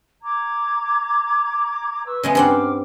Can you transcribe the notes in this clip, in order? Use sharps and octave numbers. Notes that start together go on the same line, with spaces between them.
A#5 D6 G#6
B4 C#6 E6
C#3 G#3 B3 E5
G2 C4 F#5 G5 D6 F6